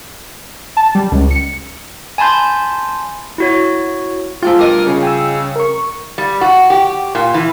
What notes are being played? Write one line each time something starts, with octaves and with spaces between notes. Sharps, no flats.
A5
G3
C#2
C#7
G#5 A5 B5 C6 G6
E4 F#4 C#5
G#2 F3 A3 F4 G5
G2 B2 G3 A#4 D#5 D#7
C#3
G5 E6
A#4 C#6
G3
F#4
G4
A#2
E3